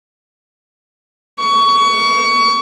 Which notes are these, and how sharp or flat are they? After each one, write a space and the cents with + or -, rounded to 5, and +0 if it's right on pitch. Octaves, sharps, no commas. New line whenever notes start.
C#6 +25